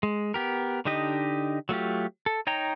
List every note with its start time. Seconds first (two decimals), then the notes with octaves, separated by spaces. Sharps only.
0.03 G#3
0.34 B3 G4 A#4
0.85 D3 D4 D#4 G4 D#5
1.69 F#3 A3 F4 G4
2.26 A4
2.47 D#4 C#5 G5 A#5